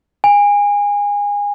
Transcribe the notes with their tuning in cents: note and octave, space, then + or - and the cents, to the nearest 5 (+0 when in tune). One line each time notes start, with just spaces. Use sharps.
G#5 -25